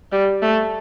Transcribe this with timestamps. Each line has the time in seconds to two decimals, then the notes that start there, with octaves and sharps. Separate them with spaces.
0.12 G3
0.42 A3